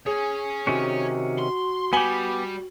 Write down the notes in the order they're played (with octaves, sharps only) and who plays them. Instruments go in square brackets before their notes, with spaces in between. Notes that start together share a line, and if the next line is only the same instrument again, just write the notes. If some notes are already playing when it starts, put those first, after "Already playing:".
[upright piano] G#4 [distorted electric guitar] C#5 G#5
[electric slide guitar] C3 D#3 C#4 [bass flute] F#4
[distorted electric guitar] C6
[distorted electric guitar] G3 [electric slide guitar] B3 G4 [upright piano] G#5 F#7 G7